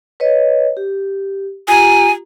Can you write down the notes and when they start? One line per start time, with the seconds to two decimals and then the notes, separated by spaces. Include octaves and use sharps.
0.20 B4 C#5 D#5
0.77 G4
1.68 F4 G4 G#5 A#5